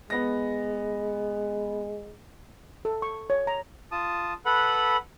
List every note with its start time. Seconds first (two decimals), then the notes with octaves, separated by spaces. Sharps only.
0.10 G#3 B3 A#6
2.85 A4
3.02 C#6
3.30 C#5
3.47 A#5
3.92 F4 A5 D#6
4.46 A4 B4 F#5 B5